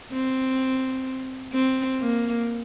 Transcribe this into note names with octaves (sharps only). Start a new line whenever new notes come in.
C4
C4
A#3